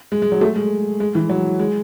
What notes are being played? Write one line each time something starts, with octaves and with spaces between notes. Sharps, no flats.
G#3
G#3
F#3
A3
G#3
G#3
E3
F#3
G#3